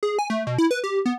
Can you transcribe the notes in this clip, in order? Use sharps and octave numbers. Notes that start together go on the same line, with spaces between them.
G#4
G#5
A3
B2
E4
B4
G4
B3